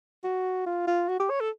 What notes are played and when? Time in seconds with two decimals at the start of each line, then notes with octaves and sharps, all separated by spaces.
0.24 F#4
0.66 F4
0.87 F4
1.09 F#4
1.20 G4
1.30 C#5
1.41 A4